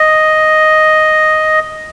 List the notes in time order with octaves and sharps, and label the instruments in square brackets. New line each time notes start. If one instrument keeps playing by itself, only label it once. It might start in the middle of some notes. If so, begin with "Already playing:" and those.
Already playing: [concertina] D#5